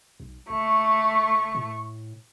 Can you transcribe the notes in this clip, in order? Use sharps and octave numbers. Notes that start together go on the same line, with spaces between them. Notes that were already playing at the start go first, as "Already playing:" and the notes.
B1
F#1 A3 C#6
A2